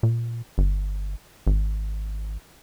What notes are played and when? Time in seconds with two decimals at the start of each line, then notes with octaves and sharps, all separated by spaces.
0.03 A#2
0.58 G1
1.47 G#1